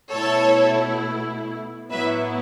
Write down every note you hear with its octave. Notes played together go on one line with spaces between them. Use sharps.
B2 A3 E4 A4 C#5
A2 F#3 B3 E4 B4 E5